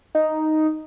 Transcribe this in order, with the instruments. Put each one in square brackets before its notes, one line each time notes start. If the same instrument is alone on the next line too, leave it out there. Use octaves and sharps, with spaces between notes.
[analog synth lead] D#4